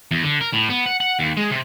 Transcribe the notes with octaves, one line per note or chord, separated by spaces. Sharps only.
E2
D3
A#4
A2
B3
F#5
F#5
D#2
G#3
C3